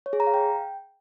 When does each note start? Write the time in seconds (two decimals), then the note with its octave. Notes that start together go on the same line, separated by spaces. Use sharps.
0.06 C#5
0.13 G#4
0.20 A#5
0.27 F5
0.34 G5